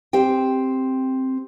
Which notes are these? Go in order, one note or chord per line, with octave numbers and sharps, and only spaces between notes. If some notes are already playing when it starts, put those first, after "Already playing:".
C4 G4 G5